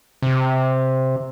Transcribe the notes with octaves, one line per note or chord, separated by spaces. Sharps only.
C3